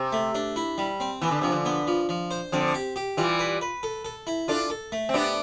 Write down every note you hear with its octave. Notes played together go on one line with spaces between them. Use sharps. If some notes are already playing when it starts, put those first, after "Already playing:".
Already playing: C3
A3
D4
E4
G3
C4
E3 B3
D3
C3 F3
D3
B3
F3
F3
C5
D3 F3 C4
G4
G4
E3 G3 F4
B4
B4
A4
A4
E4
D4 F4 A4
A4
A3
C4
B3 D4 G4